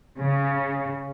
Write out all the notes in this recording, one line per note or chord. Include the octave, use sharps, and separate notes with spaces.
C#3